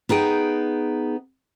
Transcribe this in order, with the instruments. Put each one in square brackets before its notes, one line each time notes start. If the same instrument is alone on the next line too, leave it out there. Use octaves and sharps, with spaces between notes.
[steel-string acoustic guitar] B3 D#4 G#4 G5